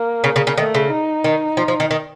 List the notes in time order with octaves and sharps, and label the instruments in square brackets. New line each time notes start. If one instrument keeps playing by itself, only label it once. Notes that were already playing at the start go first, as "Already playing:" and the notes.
Already playing: [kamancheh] A#3
[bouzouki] C#3
C#3
C#3
[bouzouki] D#3 [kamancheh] A3
[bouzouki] C#3
[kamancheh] D#4
[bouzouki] D#3
F3
F3
D#3
D#3